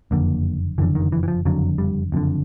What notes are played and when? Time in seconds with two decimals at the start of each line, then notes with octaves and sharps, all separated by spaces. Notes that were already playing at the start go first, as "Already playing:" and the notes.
0.11 F#1 F2 D3 A#3
0.78 F#1 F2 D3 E3
0.95 D#3
1.12 E3
1.23 E3
1.28 F3
1.45 F#1 F2 D3 F#3
1.78 G3
2.12 F#1 F2 D3